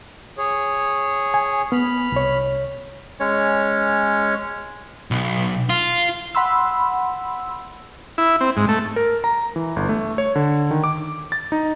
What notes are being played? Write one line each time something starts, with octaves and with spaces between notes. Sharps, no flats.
G#4 C#5
G#5
B3 B5 F6
C2 C#5
G#3 C#4 C#5
B1
F4
F#5 B5 C6 E6
E4
C4
G#2
A3
A#4
A#5
E3
G1
A3
C#5
D3
D#3
D6
A6
D#4